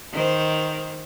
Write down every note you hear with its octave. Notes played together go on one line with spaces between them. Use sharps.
D#3 C5